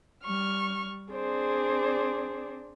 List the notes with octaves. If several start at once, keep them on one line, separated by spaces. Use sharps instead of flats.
G3 C#6 F6
C4 D4 G#4 C5 D5